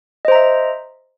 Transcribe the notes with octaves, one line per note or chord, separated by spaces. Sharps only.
C5 D#5 E5 A#5